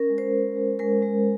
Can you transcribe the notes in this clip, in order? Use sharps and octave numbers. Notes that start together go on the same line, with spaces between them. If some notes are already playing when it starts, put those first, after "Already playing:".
Already playing: C#4 A#4
G#3
C5
G#3
G#3
G#3 A#4
G#3